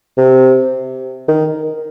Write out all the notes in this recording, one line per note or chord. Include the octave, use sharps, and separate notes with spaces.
C3
D#3